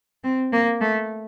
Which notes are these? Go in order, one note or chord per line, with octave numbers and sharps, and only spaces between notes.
C4
A#3
A3